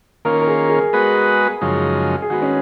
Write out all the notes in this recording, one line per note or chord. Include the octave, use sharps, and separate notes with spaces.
D#3 A#3 C#4 F4 A#4
A#4
G#4
G#4
G#3 B3 F#4 B4 D#5
F#2 C#3 F3 G#3 D#4
G#4
D#3 G#3 B3 F#4
C#4